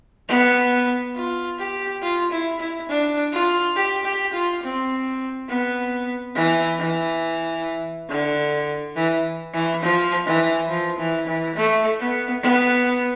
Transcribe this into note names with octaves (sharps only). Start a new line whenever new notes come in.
B3
F4
G4
F4
E4
E4
D4
F4
G4
G4
F4
C4
B3
E3
E3
D3
E3
E3
F3
E3
F3
E3
E3
A3
B3
B3